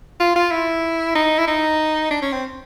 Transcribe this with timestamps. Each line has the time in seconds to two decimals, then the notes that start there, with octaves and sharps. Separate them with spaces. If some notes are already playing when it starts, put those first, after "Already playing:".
0.20 F4
0.36 F4
0.51 E4
1.16 D#4
1.38 E4
1.48 D#4
2.11 D4
2.22 C#4
2.32 C4